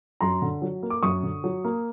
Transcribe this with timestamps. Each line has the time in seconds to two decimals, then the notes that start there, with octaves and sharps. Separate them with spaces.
0.21 F#2 A#5 C6
0.42 D3
0.62 F#3
0.83 A#3
0.90 D6
1.03 F#2 C#6 D#6
1.23 D3
1.44 F#3
1.65 A#3